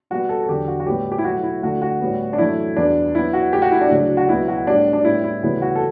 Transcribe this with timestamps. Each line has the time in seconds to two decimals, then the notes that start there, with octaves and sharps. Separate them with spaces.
0.10 B2 G3 B3 F#4
0.29 A4
0.44 A4
0.49 E2 D3 F#3 G4
0.68 F#4
0.80 F#4
0.86 A2 G3 B3 G4
1.12 G4
1.18 E4
1.24 B2 F#3 A3 F#4
1.43 E4
1.63 D2 D3 A3 F#4
1.82 F#4
2.01 A2 G3 B3
2.33 D4
2.38 F#2 E3 A3 E4
2.77 E2 B2 G3 B3 D4
3.15 B2 F#3 B3 E4
3.33 F#4
3.52 B2 A3 G4
3.62 F#4
3.72 E4
3.81 D4
3.91 D2 C#3 F#3
4.17 F#4
4.29 C#2 B2 F#3 B3 E4
4.48 F#4
4.67 A2 G3 B3 D4
4.93 D4
5.05 A2 G3 B3 E4
5.24 E4
5.43 D2 C#3 E3 G3 B3 E4
5.62 F#4
5.76 A4